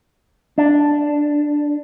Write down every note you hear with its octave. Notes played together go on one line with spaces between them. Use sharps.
D4